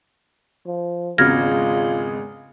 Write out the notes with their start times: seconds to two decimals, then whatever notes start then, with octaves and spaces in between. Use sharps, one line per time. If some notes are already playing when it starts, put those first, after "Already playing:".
0.66 F3
1.18 G#1 E2 C#3 G#3 F4 F6 G#6 A#6